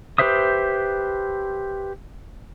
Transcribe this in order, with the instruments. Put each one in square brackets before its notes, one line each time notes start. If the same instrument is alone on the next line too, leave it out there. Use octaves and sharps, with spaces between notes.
[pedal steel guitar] G4 B4 C5 E5 D#6